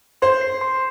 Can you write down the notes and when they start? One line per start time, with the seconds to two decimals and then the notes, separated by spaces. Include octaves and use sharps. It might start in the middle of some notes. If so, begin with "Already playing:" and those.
0.22 C5 C6
0.41 C7
0.61 C6